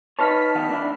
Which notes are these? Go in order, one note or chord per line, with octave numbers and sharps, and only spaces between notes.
D#4 B4 C#5 A5 F6 B6
D#3 B3 F5
A#3 D4 E4